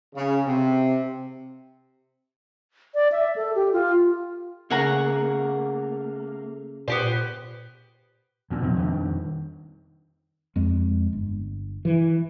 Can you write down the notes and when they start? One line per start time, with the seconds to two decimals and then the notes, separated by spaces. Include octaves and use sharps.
0.15 C#3
0.46 C3
2.94 D5
3.12 E5
3.36 A4
3.55 G4
3.73 F4
4.70 C#3 A3 A#3 C#5 F#5 G#5 A#5 C#6
6.88 A#2 B3 G4 C5
8.50 D2 A#2
8.62 F2 B2 F3 F#3
8.77 F2 D#3 G3 D4
10.56 F2 G#3
11.13 G1
11.85 E3